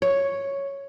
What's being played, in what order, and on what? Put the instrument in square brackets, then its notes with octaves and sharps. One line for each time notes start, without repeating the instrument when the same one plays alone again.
[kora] C#5